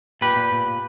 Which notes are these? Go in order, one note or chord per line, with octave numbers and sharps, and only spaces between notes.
A#2 G4 B4
A#2
A#2
A#2